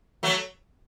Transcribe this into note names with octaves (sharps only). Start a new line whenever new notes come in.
F#3 A3